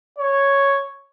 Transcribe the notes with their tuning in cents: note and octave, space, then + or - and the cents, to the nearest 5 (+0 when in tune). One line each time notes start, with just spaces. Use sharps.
C#5 +0